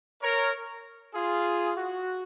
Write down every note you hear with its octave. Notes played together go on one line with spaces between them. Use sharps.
A#4 C#5
F4 G#4
F#4